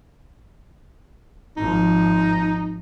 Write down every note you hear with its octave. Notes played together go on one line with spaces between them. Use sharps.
G#1 F3 D#4